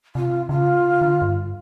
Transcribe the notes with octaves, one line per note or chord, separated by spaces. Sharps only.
C3 F4
C#3 F4
D3
G2